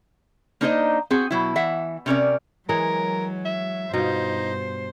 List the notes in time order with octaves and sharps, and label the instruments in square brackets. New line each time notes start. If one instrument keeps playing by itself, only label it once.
[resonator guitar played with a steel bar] A#3 D4 D#4 C5 D5 D#5
C4 F#4 G#4 F#5
B2 F#3 E4
E3 E5 F#5
C3 C#4 A#4 D5
[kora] E3 G#3 C#5 [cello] F#3 [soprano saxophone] A#4
[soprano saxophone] E5
[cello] G2 C5 [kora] B2 F4 [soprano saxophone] D#4